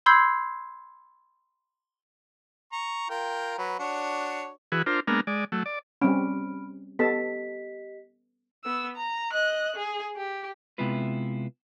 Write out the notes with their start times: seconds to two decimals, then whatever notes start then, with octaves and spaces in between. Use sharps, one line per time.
0.06 B5 C6 E6 G6 G#6 C7
2.72 A#5 C#6
3.10 F4 A#4 G5
3.58 F#3 B4
3.79 D4 F#4 C#5
4.72 E3 F#4 G#4 B4
4.86 D4 F4 A#4 C5
5.07 G#3 A#3 B3 D4 A#4
5.27 G#3 D5
5.52 F#3 A3
5.66 D5
6.02 G3 C4 C#4 B5 F6 D7
6.99 B3 G4 A4 D#5 A5 B6
8.64 B3 E6
8.96 A#5
9.32 D#5 F#6
9.76 G#4
10.16 G4
10.78 C3 G#3 B3 E4 F4 B4